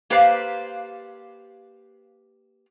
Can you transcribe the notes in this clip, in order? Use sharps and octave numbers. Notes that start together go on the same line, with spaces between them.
A#3 G4 B4 C5 D5 F5